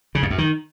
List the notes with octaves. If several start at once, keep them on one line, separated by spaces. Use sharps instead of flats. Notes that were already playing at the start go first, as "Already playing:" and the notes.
C#3
F2
F#2
D#3